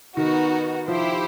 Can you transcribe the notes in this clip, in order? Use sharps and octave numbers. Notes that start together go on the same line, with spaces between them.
D#3 B3 D#4 F#4
F3 E4 G4 C5